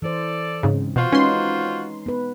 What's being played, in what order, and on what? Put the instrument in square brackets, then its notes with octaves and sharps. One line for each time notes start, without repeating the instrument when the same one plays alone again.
[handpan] E3 C5 [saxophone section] A4 D5
[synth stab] G#2 C#3 [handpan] C4
[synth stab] B2 [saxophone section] F4 F#4 C5
[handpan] G#3 D#4 B4 [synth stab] C#4 C6
[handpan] B3 B4